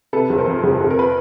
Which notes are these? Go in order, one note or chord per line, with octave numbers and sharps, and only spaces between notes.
C3 A4 B4
F1
A#4 C5
F2
F1
F1
A#4
B4